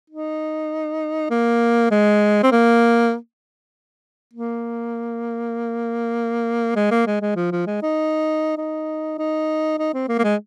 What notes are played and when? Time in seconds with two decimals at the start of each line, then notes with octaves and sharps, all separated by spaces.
0.10 D#4
1.30 A#3
1.91 G#3
2.43 C4
2.52 A#3
4.34 A#3
6.76 G#3
6.91 A#3
7.07 G#3
7.21 G#3
7.36 F3
7.52 F3
7.67 G#3
7.82 D#4
8.57 D#4
9.18 D#4
9.79 D#4
9.94 C4
10.09 A#3
10.19 A#3
10.24 G#3